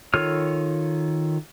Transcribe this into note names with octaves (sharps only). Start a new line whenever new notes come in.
D#3 F4 A4 C#5 F6